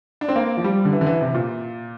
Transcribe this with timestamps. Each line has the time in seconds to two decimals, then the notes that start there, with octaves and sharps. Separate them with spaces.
0.21 D4
0.28 C4
0.36 A#3
0.57 F3
0.64 G3
0.85 D3
0.93 E3
1.01 D3
1.06 E3
1.21 C3
1.34 A#2